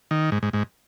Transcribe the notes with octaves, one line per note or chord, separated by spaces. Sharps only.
D#3
G#2
G#2
G#2